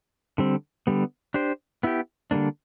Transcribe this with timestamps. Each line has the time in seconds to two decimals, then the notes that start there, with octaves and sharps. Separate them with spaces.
0.38 D3 G3 C4
0.87 D3 G3 B3
1.34 D4 G4 C5
1.83 B3 E4 G4
2.31 D3 G3 A#3 D4